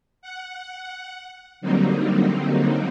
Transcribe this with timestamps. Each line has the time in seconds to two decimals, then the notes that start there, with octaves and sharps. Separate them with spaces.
0.22 F#5
1.61 D3 F#3 G3 A#3 C4 D#4